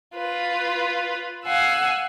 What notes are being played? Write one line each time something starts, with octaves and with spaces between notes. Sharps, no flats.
F4 B4
F5 F#5 G#5 E6